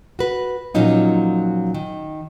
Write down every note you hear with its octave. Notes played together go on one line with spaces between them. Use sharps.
F#4 B4
A#2 F3 F#3 C#4 D#4 F4
D#3